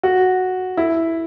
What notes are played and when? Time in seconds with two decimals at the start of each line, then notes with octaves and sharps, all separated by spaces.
0.03 F#4
0.77 E4